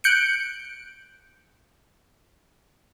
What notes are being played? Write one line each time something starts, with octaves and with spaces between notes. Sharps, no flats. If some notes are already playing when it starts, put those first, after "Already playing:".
F#6 G6 C#7 D7